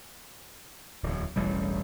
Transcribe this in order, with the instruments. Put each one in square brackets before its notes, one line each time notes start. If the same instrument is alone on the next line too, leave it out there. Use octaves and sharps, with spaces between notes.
[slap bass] D1 E2
E1 A1 G3